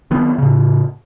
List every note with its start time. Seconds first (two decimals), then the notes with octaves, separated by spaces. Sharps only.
0.11 D#3 F#3 B3 C4
0.38 A2 C#3